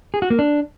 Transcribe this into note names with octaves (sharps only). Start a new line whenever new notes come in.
G#4
F#4
A#3
D4